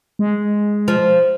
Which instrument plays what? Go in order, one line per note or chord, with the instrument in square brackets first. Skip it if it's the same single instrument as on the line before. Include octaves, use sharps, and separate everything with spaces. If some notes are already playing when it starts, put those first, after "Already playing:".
[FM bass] G#3
[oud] F3